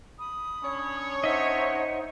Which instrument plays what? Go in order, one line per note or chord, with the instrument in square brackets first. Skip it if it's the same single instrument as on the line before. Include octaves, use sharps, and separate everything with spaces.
[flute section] B5 D#6
[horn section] C#4 D4 C#5
[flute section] D#4 C5 F#5 [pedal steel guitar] D#5 E5